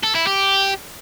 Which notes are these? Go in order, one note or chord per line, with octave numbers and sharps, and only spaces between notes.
A4
E4
G4